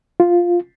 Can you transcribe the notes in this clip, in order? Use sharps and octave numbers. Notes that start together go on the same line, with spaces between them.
F4